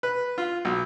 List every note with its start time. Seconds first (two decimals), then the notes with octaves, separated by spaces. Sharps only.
0.03 B4
0.38 F4
0.65 B1